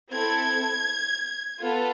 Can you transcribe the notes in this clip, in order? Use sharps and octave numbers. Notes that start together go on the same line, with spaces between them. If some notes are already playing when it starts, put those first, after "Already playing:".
C4 E4 A4 G#6
B3 F4 A4